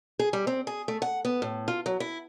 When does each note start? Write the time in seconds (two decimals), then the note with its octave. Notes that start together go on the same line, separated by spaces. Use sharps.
0.19 G#4
0.33 G3
0.47 C4
0.67 G#4
0.88 A3
1.02 F#5
1.25 B3
1.42 A2
1.68 F4
1.86 F#3
2.00 E4